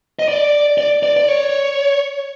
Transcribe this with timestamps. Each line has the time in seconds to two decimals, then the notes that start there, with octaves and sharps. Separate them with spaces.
0.19 D#5
0.29 D5
0.78 D5
1.03 D5
1.17 D5
1.28 C#5